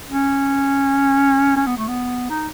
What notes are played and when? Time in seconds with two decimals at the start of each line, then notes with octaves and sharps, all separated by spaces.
0.11 C#4
1.57 C#4
1.66 B3
1.77 A3
1.88 B3
2.29 D#4